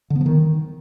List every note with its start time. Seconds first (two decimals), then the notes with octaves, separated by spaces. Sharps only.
0.10 D3
0.16 B3
0.21 F3
0.26 D#3